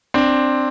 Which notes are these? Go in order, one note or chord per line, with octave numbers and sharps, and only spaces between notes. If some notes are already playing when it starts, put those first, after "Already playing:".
C4 D4